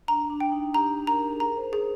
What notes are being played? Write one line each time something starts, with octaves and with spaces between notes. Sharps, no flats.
D4 A#5
D4
G5
D#4
G4 A#5
A#4 A#5
G#4
A#4 A#5
C5
G#4 C5